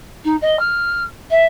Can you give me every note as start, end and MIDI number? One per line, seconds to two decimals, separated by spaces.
0.24 0.36 63
0.41 0.56 75
0.59 1.03 89
1.30 1.45 76